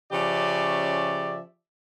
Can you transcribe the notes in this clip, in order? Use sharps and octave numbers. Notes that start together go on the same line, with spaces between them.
C#3 F3 C#4 G4 D5 E5